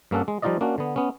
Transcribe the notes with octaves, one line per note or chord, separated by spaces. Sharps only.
G2 A#3 C#4 A4 F#5
G#3
F3 G3 D#4 F4 D5 D#5
A#3 C#4 D4 F#4
D3 B3
B3 C#4